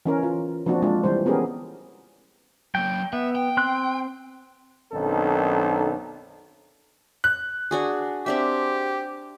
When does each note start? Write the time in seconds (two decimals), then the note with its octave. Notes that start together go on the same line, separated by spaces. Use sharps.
0.05 E3 C#4 A#4
0.23 F4
0.66 F3 A#3 C4 D4 F#4
0.82 G#3 D4 F4
1.04 E3 G3 C5
1.26 B3 C#4 G4 G#4 A#4
2.75 F#3 A#3 G5
3.13 B3 E5
3.35 G5
3.57 C4 C6 F#6
4.93 B1 F#2 D#3 C4 D4 A4
7.24 F#6
7.71 D4 F#4 G#4
8.26 C4 D4 G4 E5